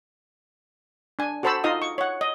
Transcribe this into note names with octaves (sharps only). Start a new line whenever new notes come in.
D4 G#5
F#4 A4 C5 A5 B5 E6
D#4 F4 D#5 F5 D#6
C#6
C#5 F#5
D#5